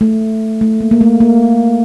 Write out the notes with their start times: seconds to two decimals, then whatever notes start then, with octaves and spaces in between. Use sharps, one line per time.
0.01 A3
0.61 A3
0.81 A#3
0.91 A#3
1.01 A3
1.20 A#3